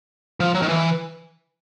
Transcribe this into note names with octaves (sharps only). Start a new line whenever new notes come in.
F3
F#3
D#3
E3